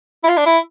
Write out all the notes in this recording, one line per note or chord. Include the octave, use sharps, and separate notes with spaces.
E4
F4
D4
E4